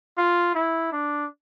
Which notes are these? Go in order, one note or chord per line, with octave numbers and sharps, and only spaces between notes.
F4
E4
D4